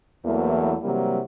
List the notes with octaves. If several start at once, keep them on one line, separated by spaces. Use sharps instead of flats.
E2 E3 F#3 A3 A#3
C3 E3 F#3 G3 A#3